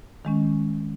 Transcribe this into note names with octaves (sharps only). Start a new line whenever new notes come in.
D#3 G#3 C#4